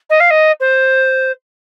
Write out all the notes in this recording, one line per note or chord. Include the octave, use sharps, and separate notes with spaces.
D#5
F5
D#5
C5